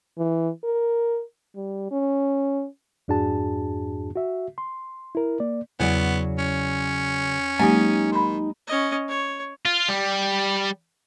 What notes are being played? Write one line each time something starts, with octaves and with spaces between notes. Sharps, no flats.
E3
A#4
G3
C#4
F2 G#2 D4 F#4 G#4 A5
F#4 E5
C6
E4 A#4
A#3 D5
E2 C#3 F#3 B3 D5
C#4
F#3 G#3 A#3 D#4 G4 G#5
D#3 B5 C6
C#4 D#5
C#5
F4
G3